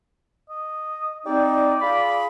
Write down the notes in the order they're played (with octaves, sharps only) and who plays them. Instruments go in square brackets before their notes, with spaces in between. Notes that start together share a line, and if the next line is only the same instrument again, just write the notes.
[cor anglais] D#5
[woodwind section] G3 C4 D#4 [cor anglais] D5
[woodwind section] F4 G#4 B5